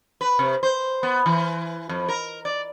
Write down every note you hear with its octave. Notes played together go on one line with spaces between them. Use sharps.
B4
C3
C5
B3
E3
F2
A#4
D5